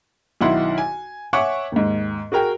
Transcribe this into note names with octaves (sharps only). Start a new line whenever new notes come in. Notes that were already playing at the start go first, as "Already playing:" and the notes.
B1 D#3 E4 F#5 C6
G#5
C#5 E5 F#5 G#5 C#6 D6
D#2 G#2
F#4 G#4 A#4 G5